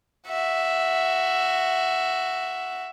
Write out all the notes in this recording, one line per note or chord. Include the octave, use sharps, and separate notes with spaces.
F#4 E5